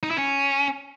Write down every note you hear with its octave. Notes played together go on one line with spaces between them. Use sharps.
D#4
E4
C#4